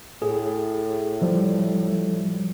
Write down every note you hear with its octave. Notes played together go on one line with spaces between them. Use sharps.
A2 G#4
F3 G3